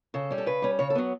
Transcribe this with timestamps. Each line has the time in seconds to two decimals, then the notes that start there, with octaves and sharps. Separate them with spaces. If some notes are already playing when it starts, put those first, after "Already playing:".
0.14 C#3 A4
0.31 G3 C#4
0.38 A4
0.46 C#3 B4
0.62 G3 C#4
0.79 C#3 C#5
0.90 A4
0.95 F#3 B3